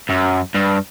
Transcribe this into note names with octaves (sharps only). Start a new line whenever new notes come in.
F#2
G2